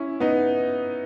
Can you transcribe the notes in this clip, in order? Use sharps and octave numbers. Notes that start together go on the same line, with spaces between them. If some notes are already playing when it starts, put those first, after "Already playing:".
Already playing: C#4 E4
B3 D#4